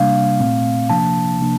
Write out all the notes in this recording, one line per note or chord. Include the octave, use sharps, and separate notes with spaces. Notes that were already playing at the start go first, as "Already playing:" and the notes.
Already playing: C3 G3 A#3 D4 F5
A#2 A3 C4
C3 F3 A#3 D4 A5
C3 F3 A#3 D4